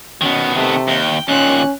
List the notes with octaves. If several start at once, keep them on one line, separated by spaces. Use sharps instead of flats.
B2 D#3 B3 C#4
C3 A3
D#2 G5
D#2 A#2 C#4 F#6